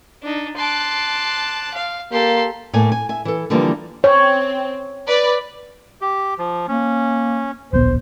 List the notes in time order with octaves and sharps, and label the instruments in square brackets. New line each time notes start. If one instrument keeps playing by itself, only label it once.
[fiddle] D4 D#4
[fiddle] A5 F#6 [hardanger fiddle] C6 D6
[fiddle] F5
[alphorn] A#3 [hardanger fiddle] G4 C6 [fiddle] A4
[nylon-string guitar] A2 A3 A#3 G#5
G#5
E5 G#5
E3 A4
D3 E3 F3 G3 A#3
[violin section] C4 [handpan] C#5
[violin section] B4 D5
[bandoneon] G4
F3
[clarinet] A#3 [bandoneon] C#4
[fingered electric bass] D1 A#1 B3 [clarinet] C5